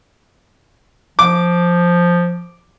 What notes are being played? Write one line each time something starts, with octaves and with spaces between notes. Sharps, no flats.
F3 D6